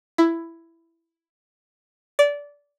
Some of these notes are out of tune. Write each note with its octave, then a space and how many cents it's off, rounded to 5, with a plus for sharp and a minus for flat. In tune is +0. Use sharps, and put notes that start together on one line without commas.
E4 +10
D5 -20